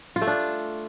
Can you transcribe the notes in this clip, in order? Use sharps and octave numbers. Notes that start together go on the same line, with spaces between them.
F4
A3
D4